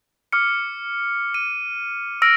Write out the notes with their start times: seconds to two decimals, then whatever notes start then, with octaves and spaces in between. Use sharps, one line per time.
0.32 D6 F6 C#7
1.34 D#7
2.22 E6 F6 A#6 D7